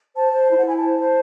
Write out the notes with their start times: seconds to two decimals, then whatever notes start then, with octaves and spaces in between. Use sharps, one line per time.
0.15 C5 A5
0.33 C5
0.49 E4
0.57 F#5
0.66 E4 G#5
0.75 A5
0.83 C5
0.99 C5